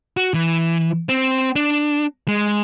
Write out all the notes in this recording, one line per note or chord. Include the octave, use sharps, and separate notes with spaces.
F#4
E3
C4
D4
G#3